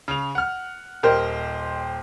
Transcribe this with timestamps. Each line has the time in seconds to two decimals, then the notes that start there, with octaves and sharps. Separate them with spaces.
0.08 C#3 F7
0.35 F#5 F6
1.03 D#1 G4 A#4 C5 D#5